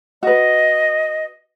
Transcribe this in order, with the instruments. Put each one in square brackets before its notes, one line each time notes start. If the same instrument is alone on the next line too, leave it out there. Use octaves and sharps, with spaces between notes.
[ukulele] F#4 B4 [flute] D#5